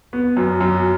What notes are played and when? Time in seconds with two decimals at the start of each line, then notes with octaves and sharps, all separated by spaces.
0.13 B3
0.37 F#2
0.61 F#2